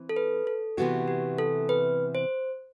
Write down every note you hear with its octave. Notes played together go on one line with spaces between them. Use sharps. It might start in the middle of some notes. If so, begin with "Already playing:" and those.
Already playing: E3 C4
A4
B4
A4
C3 E3 B3 F#4 G4
G4
A4
B4
C5